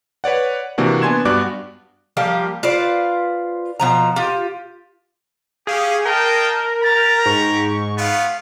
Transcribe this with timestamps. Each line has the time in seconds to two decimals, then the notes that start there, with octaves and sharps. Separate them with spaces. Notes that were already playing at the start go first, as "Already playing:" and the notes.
0.24 B4 C#5 D5 F#5
0.78 C3 E3 A#3 D4 F#4
1.02 B3 D4 G#5 C6 G#6 E7
1.25 G2 B3 F#4 D5 D6 F#6
2.17 F3 G3 A#3 G4
2.63 F4 B4 C5 D5
3.80 B2 F3 A#5
4.16 F4 G4
5.67 C#4 G4 G#4 F5
6.05 A#3 A#4 D#5 G5 A5
6.83 G4 A#5 A6
7.26 G#2 C#6
7.98 A3 B3 F4 F5